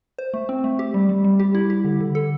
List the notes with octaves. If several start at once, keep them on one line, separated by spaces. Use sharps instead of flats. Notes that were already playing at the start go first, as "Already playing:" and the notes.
C5
A3
C4
A3
G4
G3
G3
G3
G4
E4
G4
D3
D3
A4